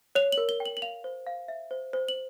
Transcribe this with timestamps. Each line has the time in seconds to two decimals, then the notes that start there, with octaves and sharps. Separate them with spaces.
0.15 C#5 F7
0.32 F#7
0.38 A#4
0.49 G7
0.60 G5
0.66 F#7
0.77 F#7
0.82 F5 F7
1.04 C5
1.27 F5
1.48 E5
1.71 C5
1.93 C5
2.08 F#7